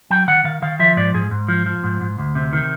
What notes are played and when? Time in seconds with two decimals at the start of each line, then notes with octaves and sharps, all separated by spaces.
0.10 F#3 G5
0.28 D#3 F#5
0.44 D#3 F5
0.62 D#3 F5
0.80 F3 E5
0.97 G#2 D5
1.14 G#2 G#4
1.31 G#2
1.48 F3
1.66 F3
1.83 G#2
2.01 G#2
2.18 D2
2.35 C3
2.53 D#3